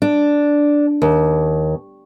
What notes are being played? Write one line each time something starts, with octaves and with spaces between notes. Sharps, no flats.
D4
D#2